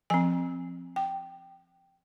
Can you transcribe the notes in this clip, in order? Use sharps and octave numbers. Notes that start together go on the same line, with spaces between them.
F3 C4 G#5
G5